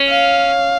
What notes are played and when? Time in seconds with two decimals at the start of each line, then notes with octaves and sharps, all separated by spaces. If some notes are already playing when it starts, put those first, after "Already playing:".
Already playing: C#4
0.09 F5